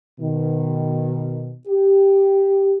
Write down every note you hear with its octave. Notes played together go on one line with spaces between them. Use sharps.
B2 D#3
G4